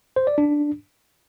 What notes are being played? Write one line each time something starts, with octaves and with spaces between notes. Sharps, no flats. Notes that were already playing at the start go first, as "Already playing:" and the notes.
C5
D5
D4